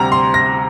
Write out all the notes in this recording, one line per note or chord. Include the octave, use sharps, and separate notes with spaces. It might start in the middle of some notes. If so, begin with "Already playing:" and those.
Already playing: D2 C3 G3 A#5
C6
A#6